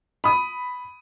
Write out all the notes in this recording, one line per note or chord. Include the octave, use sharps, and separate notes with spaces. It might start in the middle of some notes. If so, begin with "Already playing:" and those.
B5 D#6